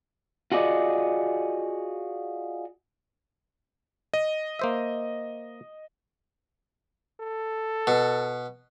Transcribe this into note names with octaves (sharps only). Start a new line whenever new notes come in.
F4 F#4 G#4 D5 D#5
D#5
A#3 C5 E5
A4
B2